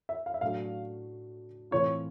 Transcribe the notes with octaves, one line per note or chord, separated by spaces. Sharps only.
E5
F5
E5
A2 F#3 A3 D4 F5
A2 E3 A3 C4 F4 C#5